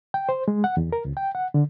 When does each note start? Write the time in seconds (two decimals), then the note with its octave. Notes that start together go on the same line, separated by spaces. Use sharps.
0.14 G5
0.29 C5
0.48 G#3
0.64 F#5
0.77 E2
0.92 A#4
1.05 C#2
1.17 G5
1.35 F#5
1.54 D3